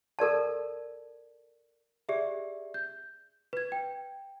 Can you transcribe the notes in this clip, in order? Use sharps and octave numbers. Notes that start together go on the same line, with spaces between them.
A4 A#4 D5 A5
G4 G#4 D5 E5
G6
B4 G#6
G5